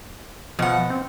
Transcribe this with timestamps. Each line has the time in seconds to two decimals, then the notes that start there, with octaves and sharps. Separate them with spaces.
0.59 B2 F3 F#5
0.90 C4